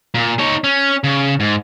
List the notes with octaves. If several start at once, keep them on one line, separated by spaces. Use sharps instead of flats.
A#2
D#4 C#5
C#4
C#3
G#2